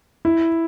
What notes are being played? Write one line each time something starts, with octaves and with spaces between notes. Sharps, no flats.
E4